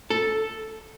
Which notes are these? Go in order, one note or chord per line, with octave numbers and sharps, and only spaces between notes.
A4